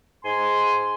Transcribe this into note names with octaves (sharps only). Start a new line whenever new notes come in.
G#2 G#5 C6